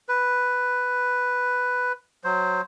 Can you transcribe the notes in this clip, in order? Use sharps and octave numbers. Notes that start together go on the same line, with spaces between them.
B4
F#3 C5